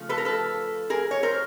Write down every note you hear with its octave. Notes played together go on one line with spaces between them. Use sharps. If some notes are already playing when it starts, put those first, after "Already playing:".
Already playing: C#3 F3 A3
A4 B4
A#4
A4 B4
G#4 A#4
C#5
A#4 C5